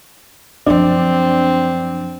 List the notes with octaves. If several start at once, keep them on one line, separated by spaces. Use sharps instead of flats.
F#2 F3 C4 D4